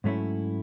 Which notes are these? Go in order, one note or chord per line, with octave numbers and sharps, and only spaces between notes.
G#2 F#3 A3 C#4 E4